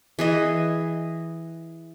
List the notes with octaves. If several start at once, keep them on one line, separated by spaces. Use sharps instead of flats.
E3 G#4 D#5